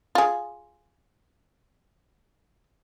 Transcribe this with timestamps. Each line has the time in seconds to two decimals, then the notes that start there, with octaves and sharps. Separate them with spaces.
0.15 F4 G#4